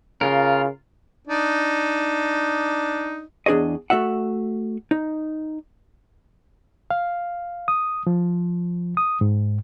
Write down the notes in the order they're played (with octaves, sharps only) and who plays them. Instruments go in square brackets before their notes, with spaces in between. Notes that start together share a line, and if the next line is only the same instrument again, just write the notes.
[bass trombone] C#3 [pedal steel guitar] F4 A#4
[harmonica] D4 D#4
[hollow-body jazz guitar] E2 D4 G#4 C#5 D#5
A3 F#4 E5 F#5
D#4
[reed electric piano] F5
D#6
F3
D#6
G#2